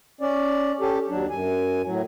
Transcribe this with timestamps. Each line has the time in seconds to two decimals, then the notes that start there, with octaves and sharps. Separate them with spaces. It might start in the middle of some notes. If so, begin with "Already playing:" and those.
0.21 C#4 D5
0.81 C#4 G4 A4
1.09 D#2 F#3 D4
1.30 F#2 G#5
1.86 A2 F#3